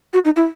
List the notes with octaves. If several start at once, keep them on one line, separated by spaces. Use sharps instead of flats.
F#4
D#4
E4